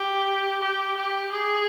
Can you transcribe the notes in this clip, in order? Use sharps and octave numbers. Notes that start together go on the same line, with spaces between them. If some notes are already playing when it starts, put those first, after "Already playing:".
Already playing: G4
G4
G4
G#4